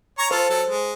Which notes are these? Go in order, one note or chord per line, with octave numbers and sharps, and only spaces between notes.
C#5 A#5 C#6
F4 A4 C5
F#3 A4
G#3